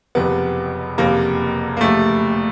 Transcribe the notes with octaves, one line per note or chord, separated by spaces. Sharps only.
F#1 F2 C3 B3
F#1 F2 C3 A#3
A#3
F#1 F2 C3 A3